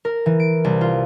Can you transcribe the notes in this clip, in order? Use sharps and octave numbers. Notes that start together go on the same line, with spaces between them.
A#4
E3
D7
C2
F4